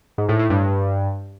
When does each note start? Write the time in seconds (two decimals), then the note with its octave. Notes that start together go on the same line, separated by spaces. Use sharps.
0.18 G#2
0.29 A2
0.39 A2
0.50 G2